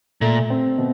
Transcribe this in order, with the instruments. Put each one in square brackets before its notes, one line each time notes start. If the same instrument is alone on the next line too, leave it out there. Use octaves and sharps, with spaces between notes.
[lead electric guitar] A#2 [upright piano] A3
[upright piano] C4
B2